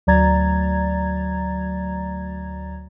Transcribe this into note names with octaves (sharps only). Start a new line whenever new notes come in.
D2 F#3 D5 A#5 G#6 A6